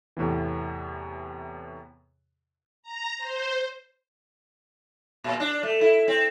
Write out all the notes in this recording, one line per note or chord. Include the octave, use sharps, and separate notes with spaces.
E2 A2 C3 E3
A#5
C5
A#2
D4
A3
E4
C4